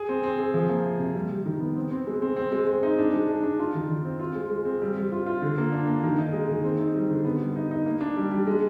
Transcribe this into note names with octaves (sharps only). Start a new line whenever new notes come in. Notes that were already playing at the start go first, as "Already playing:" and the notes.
Already playing: G#4
C4
C4
G#4
F3
A#3
C3
C3
G3
G3
D#3
B3
C4
C4
G#3
C4
C4
G#3
C4
D#4
D4
G#3
D4
D4
F4
D#3
D#3
C4
F4
G#3
G#3
C4
G3
G3
F4
F4
D3
A#3
D4
A#3
D#3
D#4
G#3
D#3
C4
D#4
G3
D3
B3
G3
D#4
D#4
A#3
D4
G3
G3
G#3